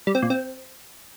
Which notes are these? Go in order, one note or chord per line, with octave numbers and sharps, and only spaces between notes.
G3
C4
A#2
C4